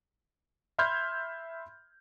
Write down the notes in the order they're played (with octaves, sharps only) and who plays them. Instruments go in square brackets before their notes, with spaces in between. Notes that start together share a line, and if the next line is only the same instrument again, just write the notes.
[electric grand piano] E5 B5 C6 F6 G6 G#6